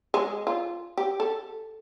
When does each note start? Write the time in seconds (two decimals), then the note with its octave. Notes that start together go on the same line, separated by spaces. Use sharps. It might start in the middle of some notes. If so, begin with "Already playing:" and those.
0.14 G#3
0.47 F4
0.97 G4
1.20 A4